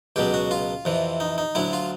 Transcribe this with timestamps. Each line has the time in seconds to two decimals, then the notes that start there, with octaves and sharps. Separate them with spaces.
0.16 C#2 B2 F#3 G4
0.34 F#4
0.51 F4
0.85 F2 C3 E3
1.20 D#4
1.38 D#4
1.55 D2 D3 F#3 E4
1.73 F4